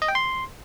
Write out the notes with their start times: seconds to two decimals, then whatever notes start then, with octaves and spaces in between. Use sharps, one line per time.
0.02 D#5
0.08 G5
0.15 C6